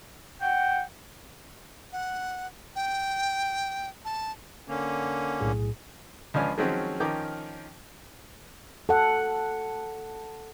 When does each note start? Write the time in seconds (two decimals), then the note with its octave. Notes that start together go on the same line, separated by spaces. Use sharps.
0.41 F#5 G5
1.93 F#5
2.76 G5
4.05 A5
4.68 D3 A#3 C#4
5.41 B1 A2 G#4
6.34 C#2 F3 C#4 D4 F5 G#5
6.58 D#3 F3 F#3 G#3 C4 C#4
7.00 D#3 F3 C#4 A#4 G5 D6
8.89 A4 F#5